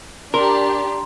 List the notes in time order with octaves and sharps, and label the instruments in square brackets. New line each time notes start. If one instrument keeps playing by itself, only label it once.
[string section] D4 G4 [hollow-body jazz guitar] A#4 [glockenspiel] A#5 C6